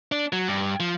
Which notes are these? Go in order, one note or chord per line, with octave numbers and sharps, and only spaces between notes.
D4
F#3
G2
F3